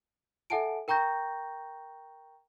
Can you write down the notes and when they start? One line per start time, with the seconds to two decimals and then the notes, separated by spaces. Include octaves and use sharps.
0.50 A4 E5 F#5 G#5 A5 D7
0.88 A#4 G5 A#5 C#6 G6 A#6